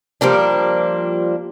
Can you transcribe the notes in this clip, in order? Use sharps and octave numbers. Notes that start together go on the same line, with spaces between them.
F3 G3 A#3 D4